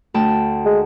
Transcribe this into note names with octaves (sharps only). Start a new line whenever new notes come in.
D2 G5 A5
G#3